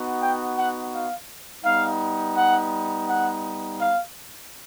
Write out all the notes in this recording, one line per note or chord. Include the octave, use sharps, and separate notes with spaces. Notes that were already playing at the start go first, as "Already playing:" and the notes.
Already playing: B3 D#4 F#4
G5
F#5
F5
G3 B3 D#4 F5
F#5
F#5
F5